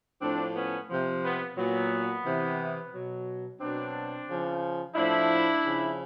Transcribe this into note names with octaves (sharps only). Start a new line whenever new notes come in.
A2 F3 C4 D4
B3 C#4
C3 F3
B3
A#2 F#3 B3
C3 E3
B2 F#3
B2 F#3 C4 D4
C#3 F3
A2 F3 D4 E4
C#3 F3